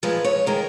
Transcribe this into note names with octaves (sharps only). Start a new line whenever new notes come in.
A#2 F3 G#3 B4
C#5
D#3 G#3 A#4